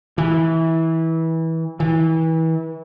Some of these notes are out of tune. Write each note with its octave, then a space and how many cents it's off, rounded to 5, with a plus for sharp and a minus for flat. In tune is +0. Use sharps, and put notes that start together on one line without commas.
E3 -20
E3 -30